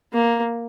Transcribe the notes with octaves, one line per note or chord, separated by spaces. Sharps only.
A#3